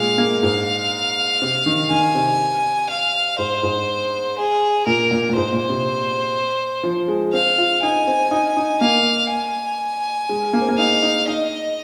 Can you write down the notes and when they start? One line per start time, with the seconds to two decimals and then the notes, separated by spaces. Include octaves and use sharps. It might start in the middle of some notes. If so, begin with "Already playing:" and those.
Already playing: A#2 G#3 F5
0.18 A#3
0.43 G#2 F5
1.42 C3
1.66 D#3
1.90 D#3 G#5
2.15 C3
2.90 F5
3.38 G#2 C5
3.63 G#2
4.38 G#4
4.86 A#2 A#4
5.11 A#2
5.29 A#2
5.36 G#2 C5
5.52 A#2
5.69 C3
6.83 F3
7.08 G#3
7.33 C4 F5
7.58 F4
7.83 D#4 G#5
8.07 C4
8.31 D#4
8.57 D#4
8.81 A#3 F5
9.30 G#5
10.29 G#3
10.53 A#3
10.62 C4
10.68 A#3
10.78 D#4 F5
11.03 D#4
11.27 D#4 D#5